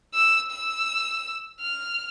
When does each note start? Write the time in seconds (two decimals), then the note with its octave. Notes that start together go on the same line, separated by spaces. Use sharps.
0.15 E6
0.52 E6
1.61 F6